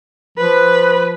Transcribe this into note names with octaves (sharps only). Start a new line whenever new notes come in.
F3 B4